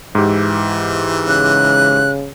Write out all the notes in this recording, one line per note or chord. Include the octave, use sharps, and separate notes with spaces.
G#2 E3 G4
C#3 F#6